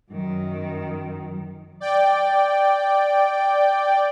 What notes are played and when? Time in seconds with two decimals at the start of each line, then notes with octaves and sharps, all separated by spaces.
0.11 F#2 D#3
1.80 D5 G5